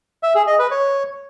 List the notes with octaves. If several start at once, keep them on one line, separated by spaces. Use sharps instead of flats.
E5
G#4
D#5
B4
C#5